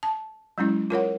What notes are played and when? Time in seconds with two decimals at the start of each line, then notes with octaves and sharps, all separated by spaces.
0.03 A5
0.58 F#3 G#3 C#4 E4
0.90 F4 A#4 C#5 F#5